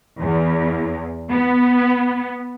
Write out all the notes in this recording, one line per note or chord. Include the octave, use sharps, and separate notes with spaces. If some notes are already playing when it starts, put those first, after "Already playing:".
E2
B3